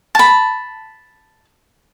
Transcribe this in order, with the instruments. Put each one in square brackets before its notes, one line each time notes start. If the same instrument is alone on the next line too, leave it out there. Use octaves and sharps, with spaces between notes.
[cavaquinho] A5 B5